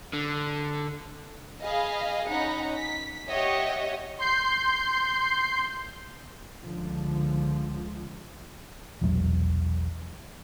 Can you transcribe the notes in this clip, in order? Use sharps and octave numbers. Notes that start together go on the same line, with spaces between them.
D3
G#4 D#5 F5 B5
C#4 D#4 F#5 A#5 B5
B6
G4 C#5 D#5 E5 F#5
C6 G6 C7
C#2 D3 F3
E1 A#1 E2 F#3